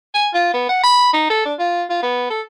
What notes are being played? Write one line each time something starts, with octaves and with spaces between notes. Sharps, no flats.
G#5
F4
B3
F#5
B5
D#4
A4
D4
F4
F4
B3
A4